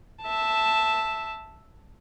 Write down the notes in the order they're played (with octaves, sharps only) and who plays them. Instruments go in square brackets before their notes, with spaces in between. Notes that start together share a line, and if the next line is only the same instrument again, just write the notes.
[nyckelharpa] E5 A5